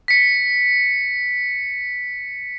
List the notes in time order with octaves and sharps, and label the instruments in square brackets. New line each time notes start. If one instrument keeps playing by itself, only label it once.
[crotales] B6 C#7